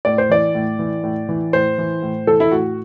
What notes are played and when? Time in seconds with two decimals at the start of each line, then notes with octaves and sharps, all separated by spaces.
0.05 A2 D5
0.18 C5
0.29 E3 D5
0.55 A2
0.79 E3
1.04 A2
1.29 E3
1.53 A2 C5
1.78 E3
2.03 A2
2.27 E3 A4
2.40 E4
2.52 A2 F#4